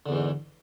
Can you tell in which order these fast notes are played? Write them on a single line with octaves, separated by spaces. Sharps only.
D3 E2 E3 G#2